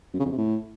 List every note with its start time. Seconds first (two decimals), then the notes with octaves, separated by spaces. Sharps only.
0.14 F#2
0.20 C#3
0.26 F2
0.32 C3
0.38 A2